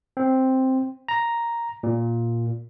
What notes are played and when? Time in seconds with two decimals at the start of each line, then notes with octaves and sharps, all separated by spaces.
0.17 C4
1.08 A#5
1.83 A#2